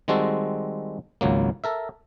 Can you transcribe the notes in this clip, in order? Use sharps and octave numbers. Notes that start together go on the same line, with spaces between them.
D#3 G3 G#3 C4 F#4 A4
G#1 C#2 F#3 A#3
A4 A#4 E5